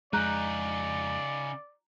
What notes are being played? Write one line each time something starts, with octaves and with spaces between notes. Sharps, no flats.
F2 C#3 G#3 D#4 D5 A#5 F#6 G6